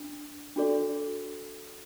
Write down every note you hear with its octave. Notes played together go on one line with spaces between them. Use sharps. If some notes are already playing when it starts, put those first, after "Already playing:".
Already playing: D4
D4 F#4 A4 D5